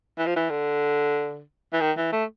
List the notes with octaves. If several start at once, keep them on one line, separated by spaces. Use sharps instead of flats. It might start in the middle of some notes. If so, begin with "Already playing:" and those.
E3
F3
E3
D3
E3
D#3
E3
A3